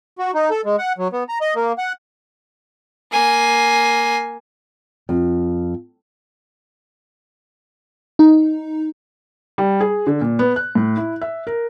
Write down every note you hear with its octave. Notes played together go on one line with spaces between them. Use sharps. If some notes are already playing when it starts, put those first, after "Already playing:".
F#4
D#4
A4
G#3
F#5
F#3
B3
A#5
D#5
A#3
F#5
A#3 G#5
F2
D#4
G3
G#4
D3
A#2
B3
F#6
A2
E4
E5
A#4